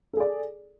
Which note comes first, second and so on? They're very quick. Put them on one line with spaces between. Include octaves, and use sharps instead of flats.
A4 G#4 D5